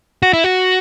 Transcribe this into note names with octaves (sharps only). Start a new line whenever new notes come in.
F#4
E4
F#4